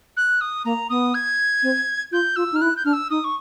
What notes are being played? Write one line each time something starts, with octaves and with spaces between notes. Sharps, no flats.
F#6
D#6
A#3 A#5
B3 D#6
G#6
C4
F4 G6
F4 E6
D#4
F6
E4 F#6
G6
D4 F6
E6
D#4 D#6
C#6